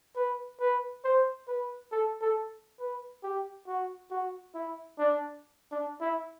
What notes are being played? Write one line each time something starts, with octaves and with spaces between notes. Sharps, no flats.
B4
B4
C5
B4
A4
A4
B4
G4
F#4
F#4
E4
D4
D4
E4